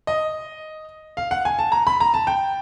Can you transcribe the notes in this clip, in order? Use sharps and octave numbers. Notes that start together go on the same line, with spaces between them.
D#5
F5
F#5
G#5
A5
A#5
B5
A#5
A5
G5